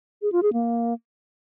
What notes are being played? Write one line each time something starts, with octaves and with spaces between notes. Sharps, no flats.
G#4
F4
G#4
A#3